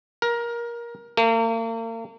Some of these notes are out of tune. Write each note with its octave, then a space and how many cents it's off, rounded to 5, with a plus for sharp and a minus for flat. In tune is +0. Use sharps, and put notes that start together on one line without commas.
A#4 +20
A#3 -40